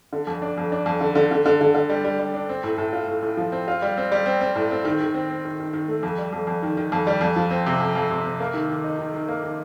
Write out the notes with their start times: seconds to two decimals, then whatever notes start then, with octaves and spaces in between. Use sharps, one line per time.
0.13 D3
0.27 F2
0.42 D4
0.58 F2
0.72 D4
0.86 F2
1.01 D3
1.15 D3
1.31 D3
1.46 D3
1.61 D3
1.75 D3
1.90 G3
2.04 G3
2.19 G3
2.34 D4
2.49 C4
2.64 A2
2.78 A2
2.93 F4
3.08 A2
3.22 A2
3.37 F3
3.52 C4
3.68 F4
3.82 G3
3.97 C4
4.12 G3
4.26 C4
4.41 C4
4.56 A2
4.71 C4
4.85 D#3
5.00 D#3
5.14 C4
5.30 C4
5.45 D#3
5.60 D#3
5.73 D#3
5.88 A3
6.03 F2
6.18 G3
6.33 F2
6.47 F2
6.63 D#3
6.77 D#3
6.92 F2
7.07 G3
7.21 F2
7.36 F3
7.51 C4
7.66 C3
7.80 F2
7.95 F2
8.10 C3
8.25 C3
8.40 A#3
8.54 D#3
8.69 D#3
8.84 D#4
8.99 D#3
9.14 D#3
9.29 A#3
9.44 D#3